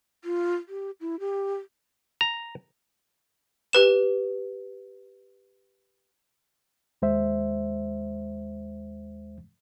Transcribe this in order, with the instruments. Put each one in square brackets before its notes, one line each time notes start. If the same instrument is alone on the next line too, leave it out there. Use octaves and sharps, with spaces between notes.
[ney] F4
G4
E4
G4
[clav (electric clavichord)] A#5
[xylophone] G4 B4 E7
[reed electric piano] D#2 G#3 C5 E5